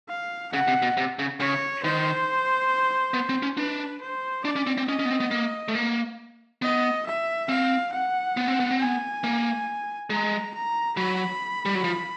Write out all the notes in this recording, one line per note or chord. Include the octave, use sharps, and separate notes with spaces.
F5
C#3 F#5
C3
B2
C3
C#3
C#3 C#5
D#3 C5
B3
C4
C#4
D4 B4
C5
D4 D5
C#4
C4
C4
C#4 D#5
C#4
B3
C4
B3
A#3
A3
A#3
B3 D#5
E5
C4 F5
F#5
B3
C4
B3
C4
B3 G#5
A#3
G#3 A#5
A#5
F#3 B5
G3
F#3
F3